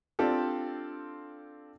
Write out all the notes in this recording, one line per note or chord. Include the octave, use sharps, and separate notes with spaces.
C4 D4 F4 G4 A4